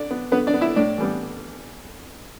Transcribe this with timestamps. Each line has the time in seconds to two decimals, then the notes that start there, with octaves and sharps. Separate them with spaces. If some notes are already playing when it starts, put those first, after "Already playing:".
Already playing: D3 D4 D5
0.11 B3
0.32 D3 B3 B4
0.47 D4 D5
0.54 B3
0.61 E4 E5
0.76 A2 D4 D5
0.98 E3 G3 B3